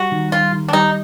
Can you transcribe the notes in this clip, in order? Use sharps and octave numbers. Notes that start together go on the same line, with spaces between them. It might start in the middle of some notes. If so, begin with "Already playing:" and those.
Already playing: G3 F#4
D#3
D#3 F4
D#3
D4
G3 D#4